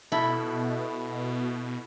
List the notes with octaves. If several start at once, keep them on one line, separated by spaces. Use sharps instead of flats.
B2 E4 A4 B5